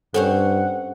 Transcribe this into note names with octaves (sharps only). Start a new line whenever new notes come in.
G2 C4 C#4 A4 C5 F#5